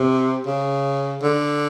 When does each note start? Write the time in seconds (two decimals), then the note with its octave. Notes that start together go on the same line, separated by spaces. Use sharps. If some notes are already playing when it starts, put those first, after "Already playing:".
Already playing: C3
0.46 C#3
1.22 D3